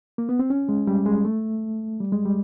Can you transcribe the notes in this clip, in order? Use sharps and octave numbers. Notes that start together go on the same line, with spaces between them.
A#3
B3
C4
C#4
G#3
G3
G#3
A3
G3
G#3
G3